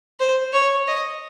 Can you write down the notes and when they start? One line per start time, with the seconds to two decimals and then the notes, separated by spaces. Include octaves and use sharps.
0.20 C5
0.53 C#5
0.88 D#5